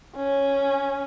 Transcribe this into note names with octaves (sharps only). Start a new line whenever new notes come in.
C#4